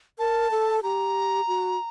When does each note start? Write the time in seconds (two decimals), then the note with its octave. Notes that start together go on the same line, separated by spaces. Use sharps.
0.19 A#4 A5
0.51 A4
0.83 G4 A#5
1.48 F#4